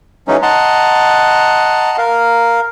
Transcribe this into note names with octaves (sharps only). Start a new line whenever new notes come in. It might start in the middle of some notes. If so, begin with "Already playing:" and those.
E3 F#3 G#3 C#4 D#4
D#5 F#5 A5 A#5 C6
A#4 F5